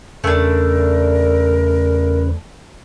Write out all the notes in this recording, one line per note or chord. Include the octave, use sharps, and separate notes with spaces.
E2 C#3 A3 D4 A#4 B4